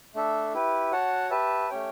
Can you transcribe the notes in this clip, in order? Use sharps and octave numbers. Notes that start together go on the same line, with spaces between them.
A3 D4 A4 E5
E4 G4 B4
F#4 C#5 F#5 A5
G4 B4 E5 A5
A3 C#4 G4 C#5 G5